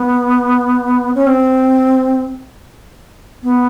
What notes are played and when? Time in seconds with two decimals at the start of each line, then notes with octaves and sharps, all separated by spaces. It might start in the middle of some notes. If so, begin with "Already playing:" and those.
Already playing: B3
1.15 C#4
1.27 C4
3.43 B3